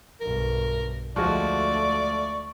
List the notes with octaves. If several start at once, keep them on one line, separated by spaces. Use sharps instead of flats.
B1 G2 A#4
D2 F3 G#3 A3 F#4 D5 C#6